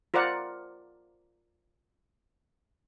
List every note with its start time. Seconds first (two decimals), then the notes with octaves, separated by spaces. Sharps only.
0.14 F4 A#4 C5 D5 F#5